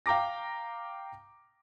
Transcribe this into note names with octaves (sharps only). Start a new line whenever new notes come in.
F5 G5 A#5 D6 A#6